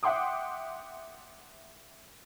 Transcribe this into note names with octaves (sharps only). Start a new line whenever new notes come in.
E5 F#5 G5 C6 D6 D#6